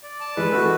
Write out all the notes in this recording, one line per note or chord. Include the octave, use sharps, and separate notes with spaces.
D5
A5
E3 G#3 B4
A3 F#4
G#3